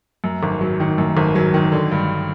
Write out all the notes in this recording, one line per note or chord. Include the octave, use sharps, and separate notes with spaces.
F#2
G#1
F#3
D#3
F#2
G#1
F#3
D#3
D3
G2